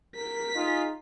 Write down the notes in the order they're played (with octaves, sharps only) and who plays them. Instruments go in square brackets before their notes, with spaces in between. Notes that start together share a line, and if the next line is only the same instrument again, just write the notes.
[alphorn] A#4 [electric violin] B6
[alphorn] D#4 [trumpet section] F4 G#4